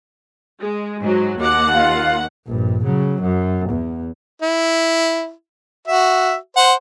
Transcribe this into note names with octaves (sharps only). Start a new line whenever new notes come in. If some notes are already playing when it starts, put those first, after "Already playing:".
G#3
G#2 F#3
D#2 F#5 D6
F4
A#1 G2
C#3 F#3
F#2
E2
E4
F#4 E5
C5 F#5